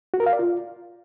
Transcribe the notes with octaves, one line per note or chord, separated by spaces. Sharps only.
F#4
A#4
F5
D5
F4